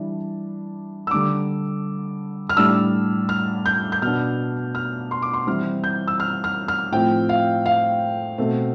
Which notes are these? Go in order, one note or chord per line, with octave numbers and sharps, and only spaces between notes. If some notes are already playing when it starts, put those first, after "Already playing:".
Already playing: E3 G3 D4
E6
D3 G3 D4 D6
F6
A2 G3 D4 E6
F6
G6
G6
B2 B3 D4 F6
F6
C6
D6
C6
E3 G3 C4 F6
G6
E6
F6
F6
F6
A2 F3 C4 G5
F5
F5
B2 A3 C4